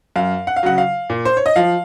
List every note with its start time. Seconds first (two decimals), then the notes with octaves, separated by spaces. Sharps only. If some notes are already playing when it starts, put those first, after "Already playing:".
0.16 F#2 F5
0.47 F#5
0.56 F5
0.63 C#3 F#3 F#5
0.78 F5
1.10 A#2
1.25 C5
1.37 C#5
1.46 D#5
1.56 F3 F5